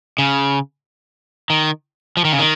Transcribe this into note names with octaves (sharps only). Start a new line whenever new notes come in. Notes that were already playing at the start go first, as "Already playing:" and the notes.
C#3
D#3
F3
D#3
C#3
D#3